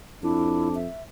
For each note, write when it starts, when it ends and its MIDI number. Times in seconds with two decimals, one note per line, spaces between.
0.23 0.87 41
0.23 0.75 62
0.23 0.69 64
0.75 1.02 76